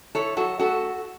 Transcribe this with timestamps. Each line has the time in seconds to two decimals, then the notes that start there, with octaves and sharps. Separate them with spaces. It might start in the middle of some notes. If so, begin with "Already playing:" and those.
0.15 E4 A4 C#5
0.36 F#3 F#4 A4
0.59 A3 F#4 A4